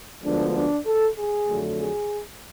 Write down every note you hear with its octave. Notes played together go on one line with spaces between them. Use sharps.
D2 D3 F3 G#3 B3 D4
D4
A4
G#4
F2 D3 F#3 A3
G#4